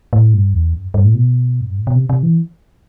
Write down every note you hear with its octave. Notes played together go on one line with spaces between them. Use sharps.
A2
G2
E2
F#2
G2
A2
B2
F#2
G2
A2
B2
C3
C3
E3